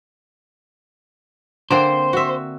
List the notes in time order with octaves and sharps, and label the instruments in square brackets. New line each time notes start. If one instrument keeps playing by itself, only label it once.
[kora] D3 A#3 C4 [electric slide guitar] C5
[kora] F#4 E5